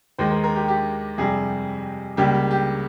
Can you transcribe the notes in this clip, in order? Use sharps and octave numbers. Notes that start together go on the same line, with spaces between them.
D#2 D#3 G#3 C5
A#4
A#4
G4
G4
F2 C3 G3 G#4
C#2 C#3 G3 A#3 G4
G4
G4